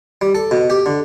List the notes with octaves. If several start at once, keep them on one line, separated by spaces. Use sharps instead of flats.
G3
A4
B2
G4
D3